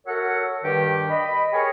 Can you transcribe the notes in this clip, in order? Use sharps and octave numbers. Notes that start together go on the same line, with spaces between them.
F#4 A4 A#4 C#5 E5 F#5
G2 D#3 G4
D#5 B5
G4 G#4 A#4 C#5